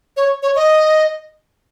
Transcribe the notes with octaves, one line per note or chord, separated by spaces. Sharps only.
C#5
C#5
D#5